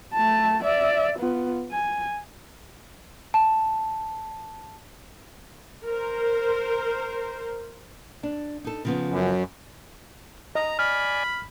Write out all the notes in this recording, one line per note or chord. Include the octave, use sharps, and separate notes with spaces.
A3 A5
D5 E5
B3 F4
G#5
A5
A#4 C5
D4
D#4 A4
C#3 F3 B3
F#2
D#5 A#5
D5 G#5 B5 F6